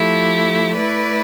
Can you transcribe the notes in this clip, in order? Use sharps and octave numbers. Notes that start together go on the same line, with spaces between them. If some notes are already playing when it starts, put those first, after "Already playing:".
Already playing: F3 A3 E4 G4
A3 E4 B4 D5